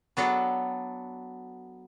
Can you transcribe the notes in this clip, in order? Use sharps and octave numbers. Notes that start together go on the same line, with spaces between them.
F#3 B3 D4 F#4 A4